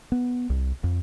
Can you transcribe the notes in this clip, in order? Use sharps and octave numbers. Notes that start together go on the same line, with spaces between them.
B3
C2
F2